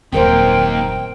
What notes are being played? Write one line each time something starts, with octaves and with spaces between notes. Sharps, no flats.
D#1 F#2 D#3 A#3 C4 A#4 C5 G5